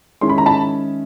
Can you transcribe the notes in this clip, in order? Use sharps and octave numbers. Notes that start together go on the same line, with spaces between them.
D#3 G#3 C#4 E4 C6
B5
A#5
A5 B5